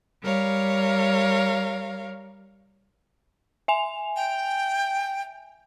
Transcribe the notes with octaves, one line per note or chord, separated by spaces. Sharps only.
G3 A#4 C#5 F5
E5 G#5 F7
G5